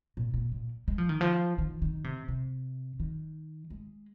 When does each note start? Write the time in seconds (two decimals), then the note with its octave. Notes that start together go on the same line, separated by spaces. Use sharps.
0.17 A#2
0.34 A#2
0.52 A#2
0.88 G#3
0.98 F3
1.09 D#3
1.21 F3
1.58 D#3
1.82 D#3
2.04 C3
2.28 C3
3.00 D#3
3.70 G#3